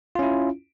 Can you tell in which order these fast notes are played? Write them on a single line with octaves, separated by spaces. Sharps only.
F4 C#4 E4